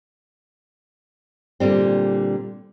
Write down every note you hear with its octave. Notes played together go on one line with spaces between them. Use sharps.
A#2 D3 G3 C4